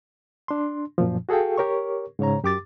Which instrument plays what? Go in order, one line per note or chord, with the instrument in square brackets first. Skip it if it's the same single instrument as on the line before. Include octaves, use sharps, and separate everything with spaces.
[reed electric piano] D4 C6
F#2 A#2 F3
F#4 G#4 A4 F5 G5
G4 A#4 C#5 C#6
G#2 C#3 C#5 A#5
F#2 G4 D6 A6